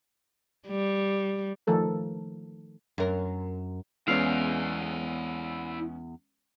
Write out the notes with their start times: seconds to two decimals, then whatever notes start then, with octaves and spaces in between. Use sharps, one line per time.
0.68 G3
1.67 D#3 F3 A3 A4 A#4
2.98 F#2 A#4
4.08 E2 G#3 B3 C#4 E4 D5 F5